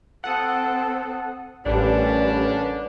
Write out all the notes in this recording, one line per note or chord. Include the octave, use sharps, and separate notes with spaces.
C4 A4 F#5 D#6
A1 D3 G3 A#3 C#4 D4 B4